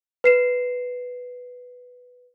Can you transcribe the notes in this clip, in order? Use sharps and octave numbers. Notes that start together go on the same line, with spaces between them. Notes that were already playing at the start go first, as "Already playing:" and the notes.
B4 C7 E7